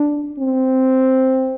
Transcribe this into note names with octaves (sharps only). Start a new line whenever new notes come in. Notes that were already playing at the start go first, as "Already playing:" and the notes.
Already playing: D4
C4